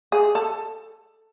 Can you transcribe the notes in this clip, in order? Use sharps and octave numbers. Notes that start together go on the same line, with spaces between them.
G#4
A4